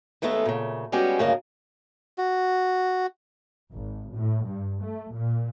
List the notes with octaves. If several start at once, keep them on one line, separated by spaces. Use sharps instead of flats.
D#2 G#3 A3 B3 E4 A4
A#2 C#3
G3 G#3 B3 C#4 F#4 G4
D2 G2 C#3 A#3 C#4 D#5
F#4
G#1
A2
G2
A3
A#2